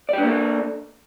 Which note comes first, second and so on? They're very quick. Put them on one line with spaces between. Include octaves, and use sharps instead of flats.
D5 G4 D4 A#3 A4